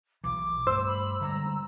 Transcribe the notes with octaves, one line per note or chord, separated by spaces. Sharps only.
B1 E3 D6
G2 A3 C5 E6
B5
D3 G3 G#3 A#5